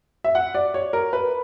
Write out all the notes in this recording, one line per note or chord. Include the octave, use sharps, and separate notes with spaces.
E5
F#5
D5
C#5
A#4
B4